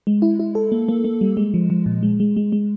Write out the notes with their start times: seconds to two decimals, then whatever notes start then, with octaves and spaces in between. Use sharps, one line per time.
0.07 G#3
0.22 E4
0.40 E4
0.55 A4
0.72 A#3
0.88 A#3
1.04 A#3
1.21 G3
1.37 G#3
1.54 F3
1.70 F3
1.86 A#2
2.03 G#3
2.20 G#3
2.37 G#3
2.52 G#3